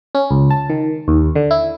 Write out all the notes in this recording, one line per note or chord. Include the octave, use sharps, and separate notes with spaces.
C#4
C#2
A5
D#3
D#2
D3
E4